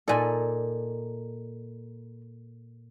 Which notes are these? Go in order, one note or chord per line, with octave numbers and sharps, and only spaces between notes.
A#2 D#4 A4 D5 G#5